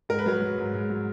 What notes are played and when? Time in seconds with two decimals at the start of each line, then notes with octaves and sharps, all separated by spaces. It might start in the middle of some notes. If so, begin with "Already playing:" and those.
0.09 G#2 A#4
0.19 B4
0.26 F#3 A#4
0.42 F#3
0.58 G#2
0.74 G#2
0.90 F#3